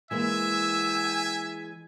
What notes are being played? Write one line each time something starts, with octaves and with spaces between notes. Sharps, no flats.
E3 G#3 A#3 E5 G#5 E6